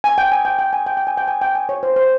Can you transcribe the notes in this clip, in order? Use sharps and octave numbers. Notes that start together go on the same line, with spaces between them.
G#5
G5
G#5
G5
G5
G#5
G5
G5
G#5
G5
G#5
G5
G#5
C#5
C5
C5